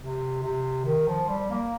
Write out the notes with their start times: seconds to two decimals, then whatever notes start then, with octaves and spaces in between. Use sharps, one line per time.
0.01 C3
0.43 C3
0.85 D#3
1.08 F3
1.29 G3
1.50 A#3